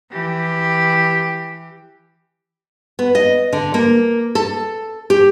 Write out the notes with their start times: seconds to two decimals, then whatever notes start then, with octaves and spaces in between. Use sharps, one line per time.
0.11 E3 G4
2.99 B3
3.15 D#5
3.53 D3
3.74 A#3
4.35 A4
5.10 G4